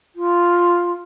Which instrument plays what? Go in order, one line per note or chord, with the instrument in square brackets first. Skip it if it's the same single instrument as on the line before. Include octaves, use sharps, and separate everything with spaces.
[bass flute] F4